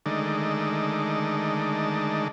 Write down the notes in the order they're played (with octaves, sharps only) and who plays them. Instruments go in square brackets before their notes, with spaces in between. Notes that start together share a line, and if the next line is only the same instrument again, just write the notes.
[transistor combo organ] D3 D#3 G#3 A3 D#4 D5